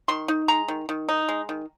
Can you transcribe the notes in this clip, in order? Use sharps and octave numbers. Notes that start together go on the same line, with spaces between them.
D#3 C6
D#4
G#3 A#5
D#3
D#3
D#4
G#3
D#3